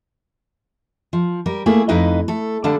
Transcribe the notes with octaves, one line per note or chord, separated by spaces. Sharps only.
F3
G3 A#4
A3 A#3 E4 G#4
F2 D#4 E4 B4 D#5 F5
A3 A4
D3 G3 D4 A4 F5 A5